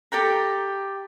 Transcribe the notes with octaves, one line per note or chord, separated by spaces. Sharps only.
G4 A4 G5 A#5